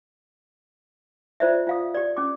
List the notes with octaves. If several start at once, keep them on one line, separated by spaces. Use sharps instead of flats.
F4 C5 D5 E5
F4 F5 D#6
G4 D5
C#4 D6